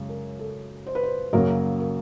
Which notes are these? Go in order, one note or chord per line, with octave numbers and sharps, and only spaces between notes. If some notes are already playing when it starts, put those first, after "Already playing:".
Already playing: F#2 C#3 G#3
A#4
A4
C5
B4
C5
F#2 C#3 F#3 A#3 A#4
A#4